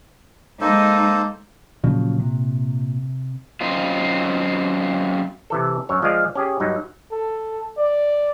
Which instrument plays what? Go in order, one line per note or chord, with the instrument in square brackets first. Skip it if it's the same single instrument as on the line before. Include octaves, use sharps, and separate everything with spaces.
[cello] G#3 D#4 [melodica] A#3 A4 C5
[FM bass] A#2 [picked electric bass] C#3 F3 F#3
[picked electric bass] C3
[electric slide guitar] F#2 C4 D#4 F4
[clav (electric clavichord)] C3 E3 A4
F#2 C#5
F3 G#3 G#4 D5 F5
C#4 G4 G#4
G2 F#3 D#4
[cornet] A4
D5